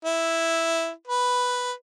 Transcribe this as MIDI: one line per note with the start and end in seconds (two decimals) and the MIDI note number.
0.05 0.90 64
1.07 1.72 71